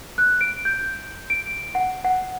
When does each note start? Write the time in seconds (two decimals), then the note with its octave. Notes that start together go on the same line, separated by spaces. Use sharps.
0.18 F#6
0.41 D7
0.65 G6
1.30 D7
1.75 F#5
2.04 F#5